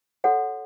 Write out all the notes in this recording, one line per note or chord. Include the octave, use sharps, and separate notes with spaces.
F#4 A4 C#5 F#5